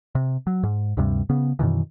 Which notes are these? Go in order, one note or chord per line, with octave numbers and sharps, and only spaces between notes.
C3
F#3
G#2
D2 G2 C3 G3
C#3 B3
F#2 B2 D#3 E3